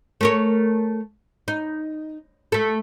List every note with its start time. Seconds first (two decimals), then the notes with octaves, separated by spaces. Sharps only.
0.21 A3 A#4 C#5
1.48 D#4
2.52 A3 A4